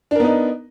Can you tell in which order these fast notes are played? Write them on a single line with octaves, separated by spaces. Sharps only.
D4 A#4 B3 D#4